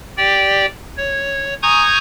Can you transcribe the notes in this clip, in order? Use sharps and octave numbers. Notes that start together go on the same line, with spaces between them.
G4 D5 G5
C#5
G#5 A#5 C#6 D#6 G6 G#6